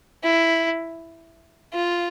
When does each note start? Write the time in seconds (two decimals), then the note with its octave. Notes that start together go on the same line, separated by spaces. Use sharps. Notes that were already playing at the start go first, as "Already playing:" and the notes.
0.23 E4
1.73 F4